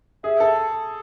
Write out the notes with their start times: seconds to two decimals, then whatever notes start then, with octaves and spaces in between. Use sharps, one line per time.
0.24 G#4 E5
0.40 A4